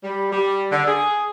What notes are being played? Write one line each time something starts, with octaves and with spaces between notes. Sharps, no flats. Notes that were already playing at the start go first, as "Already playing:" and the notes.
G3
G3
D3
G#4